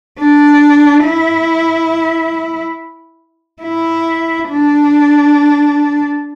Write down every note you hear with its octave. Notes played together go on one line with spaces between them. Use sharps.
D4
E4
E4
D4